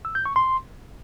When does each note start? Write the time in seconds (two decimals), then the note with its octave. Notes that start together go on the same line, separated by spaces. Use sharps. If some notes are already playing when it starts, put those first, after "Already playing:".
0.05 E6
0.15 G6
0.26 C#6
0.36 C6